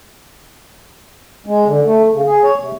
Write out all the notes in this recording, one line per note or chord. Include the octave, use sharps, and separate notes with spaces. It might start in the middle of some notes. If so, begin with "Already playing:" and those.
G#3
D3
A3
C#3
G#4
C#5
C3